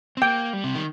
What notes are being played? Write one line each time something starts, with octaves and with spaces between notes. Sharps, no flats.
C4
A#3 G5
G3
C3
D#3